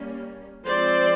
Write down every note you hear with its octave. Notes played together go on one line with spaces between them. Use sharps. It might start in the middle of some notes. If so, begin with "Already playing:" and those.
Already playing: G3 A#3 C#4
F3 G#3 C4 C5 D5